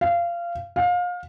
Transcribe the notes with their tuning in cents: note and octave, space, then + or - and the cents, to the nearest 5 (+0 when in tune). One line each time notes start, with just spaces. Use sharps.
F5 -20
F5 +30